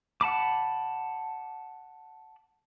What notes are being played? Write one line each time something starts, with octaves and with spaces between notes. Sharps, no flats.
F#5 A5 B5 D6